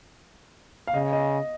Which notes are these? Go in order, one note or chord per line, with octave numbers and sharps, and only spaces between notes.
F5
C#3 D#5
D#5